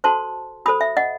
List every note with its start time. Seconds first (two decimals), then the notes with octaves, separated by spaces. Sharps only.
0.04 F#4 A4 C5 A5 C6
0.66 F#4 A4 C5 B5 D#6
0.81 E5
0.97 D#5 F#5